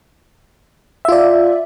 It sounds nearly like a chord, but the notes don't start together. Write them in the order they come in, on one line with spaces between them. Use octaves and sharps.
E5 F4 D5